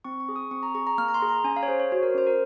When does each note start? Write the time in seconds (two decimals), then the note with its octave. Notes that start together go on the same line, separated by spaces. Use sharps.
0.04 C4 C#6
0.20 C#6
0.29 G#4
0.36 D#6
0.51 C4 C#6
0.63 A#5
0.75 G#4 C#6
0.87 A#5
0.98 A#3 F6
1.08 A#5
1.14 C6
1.22 G#4
1.29 A#5
1.44 C#4 G#5
1.56 F5
1.63 C#5
1.68 G#4 C5
1.80 C#5
1.92 F#4 C5
2.03 A#4
2.14 C#4 C5
2.27 A#4